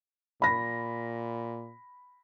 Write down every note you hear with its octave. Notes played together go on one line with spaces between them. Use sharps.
A#2 B5 A#6